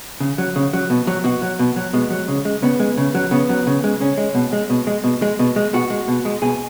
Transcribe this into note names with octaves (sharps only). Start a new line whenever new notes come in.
C#3
F#3
C#3
F#3
B2
F#3
B2 F#4
F#3
B2
F#3
B2 G#3
F#3
C#3
G#3
C#3 B3
G#3
C#3
F#3
C#3 B3
F#3
C#3
G#3
C#3 C#4
G#3
B2
G#3
B2
G#3
B2
G#3
B2
G#3
B2 F#4
G#3
B2
G#3
B2 G#4